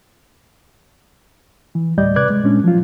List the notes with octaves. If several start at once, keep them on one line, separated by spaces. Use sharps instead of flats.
E3
D2 A2 G3 D5 D#5 G6
C3 B4 D5 D6 F#6 G#6
G#3
A#2 G#3 C#4 D4
F3 F#3 F4